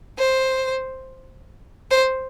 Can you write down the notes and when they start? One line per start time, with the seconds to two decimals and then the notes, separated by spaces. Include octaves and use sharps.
0.19 C5
1.91 C5